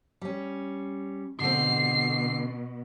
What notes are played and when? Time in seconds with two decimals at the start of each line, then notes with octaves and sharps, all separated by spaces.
0.21 G3 C#4
1.40 B2 D3 C4 C7